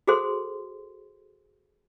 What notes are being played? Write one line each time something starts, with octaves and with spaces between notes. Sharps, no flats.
F#4 G#4 A4 C5 C6